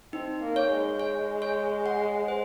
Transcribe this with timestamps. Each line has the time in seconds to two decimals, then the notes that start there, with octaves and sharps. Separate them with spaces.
0.13 C4 D#4
0.42 A#3
0.56 C#5
0.70 G#3
1.00 C#5
1.42 C#5
1.86 F#5
2.28 C5